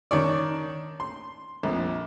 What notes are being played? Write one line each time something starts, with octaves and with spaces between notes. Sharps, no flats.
D#3 D4 C#5 D5
C6
A#1 F2